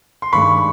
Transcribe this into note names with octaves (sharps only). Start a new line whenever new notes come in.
C6
G2 D#3 G#3 B5 C#6